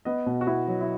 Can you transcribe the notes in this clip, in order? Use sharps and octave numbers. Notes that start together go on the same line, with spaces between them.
B3 D#5
B2
F#4
B3 E4
F#3
E4